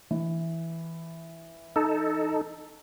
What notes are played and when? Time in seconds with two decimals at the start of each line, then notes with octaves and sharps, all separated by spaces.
0.11 E3
1.76 D#4 A4